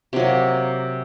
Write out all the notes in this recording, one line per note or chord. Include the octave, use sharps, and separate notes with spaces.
C3 F#3 A#3